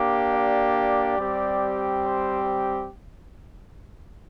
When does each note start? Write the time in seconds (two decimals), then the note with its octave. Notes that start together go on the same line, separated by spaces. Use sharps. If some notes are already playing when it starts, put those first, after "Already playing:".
Already playing: A#3 D4 G4
0.33 D5
1.18 G3 C4 G4
2.04 C5